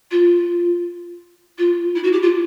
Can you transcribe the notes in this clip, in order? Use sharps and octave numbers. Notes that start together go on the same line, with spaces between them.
F4
F4
E4
F#4
G4
F4